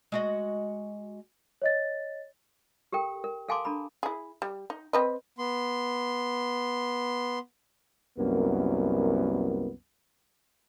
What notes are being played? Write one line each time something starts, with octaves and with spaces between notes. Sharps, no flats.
G#3 F#4 D#5
C#5 D#5 A6
G4 A4 A#4 G5
A#4
A4 F5 G#5 A5 C6 D6
D4 A4 A#5 B5
E4 G#4
G3
D#4
C4 B4 D#5
B3 C6
C2 F#2 A#3 B3